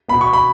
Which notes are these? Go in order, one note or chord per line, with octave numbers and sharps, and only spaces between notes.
B2 B3 B5
C#6
B5